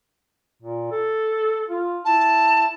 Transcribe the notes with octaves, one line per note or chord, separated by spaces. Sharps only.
A#2
A4
F4
E4 A5